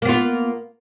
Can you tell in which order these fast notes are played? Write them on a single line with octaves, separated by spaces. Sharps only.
A#3 B3 F4